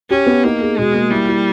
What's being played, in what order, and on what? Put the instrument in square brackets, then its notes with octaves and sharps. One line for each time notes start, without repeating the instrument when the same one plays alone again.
[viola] C#4 [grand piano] G4
[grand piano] B3
[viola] A#3 [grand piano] D#4
[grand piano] G#4
[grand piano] B2 [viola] G#3
[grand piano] A#3
[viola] G3 [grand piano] E4
[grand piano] E4